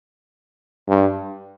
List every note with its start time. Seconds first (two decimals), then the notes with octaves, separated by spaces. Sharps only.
0.88 G2